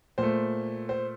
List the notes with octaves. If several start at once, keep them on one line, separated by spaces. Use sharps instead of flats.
A#2 A3 C5
C5